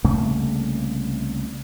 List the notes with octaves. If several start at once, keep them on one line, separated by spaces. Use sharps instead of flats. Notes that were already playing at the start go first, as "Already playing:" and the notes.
C2 C#3 A3 A#3